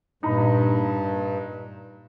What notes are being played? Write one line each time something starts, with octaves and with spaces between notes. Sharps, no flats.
G2 A#2 D#4 A#5 B5